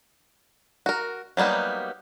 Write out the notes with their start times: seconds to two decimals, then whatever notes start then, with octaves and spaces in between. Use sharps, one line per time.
0.86 F#4 A#4
1.37 F#3 G3 A#3 B3 D#4